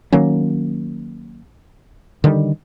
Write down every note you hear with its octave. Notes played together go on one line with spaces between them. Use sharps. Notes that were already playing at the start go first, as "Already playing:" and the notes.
D#3 F#3 A#3 C#4
D3 D#3 G3